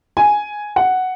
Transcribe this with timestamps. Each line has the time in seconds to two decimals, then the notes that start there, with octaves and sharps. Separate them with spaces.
0.17 G#5
0.76 F#5